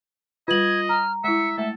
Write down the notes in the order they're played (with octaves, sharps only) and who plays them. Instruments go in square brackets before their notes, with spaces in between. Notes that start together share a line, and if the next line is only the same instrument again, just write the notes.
[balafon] G3 B4 [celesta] F4 F#7 [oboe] D#5 [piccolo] G#6
[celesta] A#5 [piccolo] F6
[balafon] G#3 E4 [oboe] E5 [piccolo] C#7
[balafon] G#3 A3 [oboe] A4 [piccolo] E5